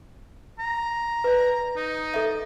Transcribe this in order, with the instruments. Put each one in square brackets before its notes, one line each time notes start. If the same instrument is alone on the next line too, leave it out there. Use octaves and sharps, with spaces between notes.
[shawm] A#5
[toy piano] B4 D5
[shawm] D#4
[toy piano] A4 D#5 E5